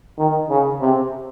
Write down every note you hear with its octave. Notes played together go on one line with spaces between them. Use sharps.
D#3
C#3
C3